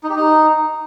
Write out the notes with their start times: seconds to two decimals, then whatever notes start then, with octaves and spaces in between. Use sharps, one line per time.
0.03 D#4
0.10 G4
0.16 D#4